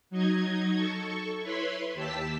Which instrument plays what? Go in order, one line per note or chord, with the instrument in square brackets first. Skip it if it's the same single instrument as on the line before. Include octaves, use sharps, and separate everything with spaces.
[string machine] F#3 D#4 D#5 G#6
A4 C#6
E4 B4 C#5 B5 C6
D#2 G4 A5 E6 B6